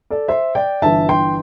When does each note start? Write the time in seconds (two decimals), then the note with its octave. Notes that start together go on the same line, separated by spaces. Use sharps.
0.10 A4 D5
0.28 C5 E5
0.55 D5 G5
0.82 G1 G2 E3 E5 A5
1.09 G5 C6